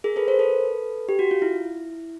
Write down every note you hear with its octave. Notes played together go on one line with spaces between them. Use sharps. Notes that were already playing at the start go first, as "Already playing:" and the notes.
G#4 A#4
A4 B4
A#4 C5
A4 B4
G4
F#4
F4
E4